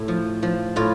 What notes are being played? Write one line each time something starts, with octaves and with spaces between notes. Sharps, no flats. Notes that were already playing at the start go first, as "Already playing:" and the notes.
Already playing: A2
F3
F3
A2 F4